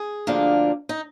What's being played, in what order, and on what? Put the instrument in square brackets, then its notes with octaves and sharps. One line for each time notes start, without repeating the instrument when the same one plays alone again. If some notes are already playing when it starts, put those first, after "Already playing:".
Already playing: [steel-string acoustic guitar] G#4
D2 D3 F3 A#3 D4
D#4